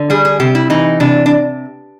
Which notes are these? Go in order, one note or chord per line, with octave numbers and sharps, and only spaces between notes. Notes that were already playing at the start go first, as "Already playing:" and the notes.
Already playing: D3
G3 G#4
G#4
C3 G4
E4
E3 D#4
C3 D4
D4